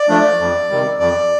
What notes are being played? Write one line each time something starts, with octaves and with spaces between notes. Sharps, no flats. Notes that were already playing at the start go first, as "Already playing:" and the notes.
Already playing: D5
F3 A3 D4
F2
C3 D#3 G3
F2 D5